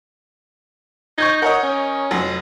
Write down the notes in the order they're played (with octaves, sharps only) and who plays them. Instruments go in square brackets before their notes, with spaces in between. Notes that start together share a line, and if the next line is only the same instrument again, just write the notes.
[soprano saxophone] D#4 [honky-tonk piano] C#6 G6 G#6
[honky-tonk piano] A#4 C#5 D#5 [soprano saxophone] F#5
[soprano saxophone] C#4
[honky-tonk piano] F1 F2 F#3